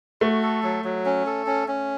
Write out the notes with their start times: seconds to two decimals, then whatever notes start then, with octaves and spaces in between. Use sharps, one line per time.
0.21 A3 F#4
0.42 A4
0.63 F#3
0.84 F#3
1.05 C#4
1.27 A4
1.47 C#4
1.68 C#4